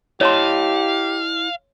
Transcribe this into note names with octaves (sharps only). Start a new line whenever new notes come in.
E4 G4 C#5 D#5 F5 A5 C6